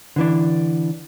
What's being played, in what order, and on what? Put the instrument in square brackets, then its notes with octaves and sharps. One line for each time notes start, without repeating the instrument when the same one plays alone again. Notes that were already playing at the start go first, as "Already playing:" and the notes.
[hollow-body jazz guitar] D3 E3 D4